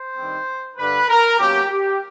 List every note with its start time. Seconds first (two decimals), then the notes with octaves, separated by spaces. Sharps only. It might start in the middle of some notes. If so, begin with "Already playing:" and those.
Already playing: C5
0.16 G2 D#3 G3 C4
0.77 G2 D3 G3 B4
1.08 A#4
1.39 B2 F#3 A#3 C#4 G4
1.69 G4